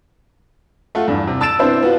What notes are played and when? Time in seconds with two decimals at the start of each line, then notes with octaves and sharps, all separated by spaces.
0.95 A3 F4 F#5
1.08 E2 G2
1.27 C3
1.41 A5 E6 A6 D7 E7
1.59 B3 C4 D4 E4 C5
1.82 B3 F4 F#4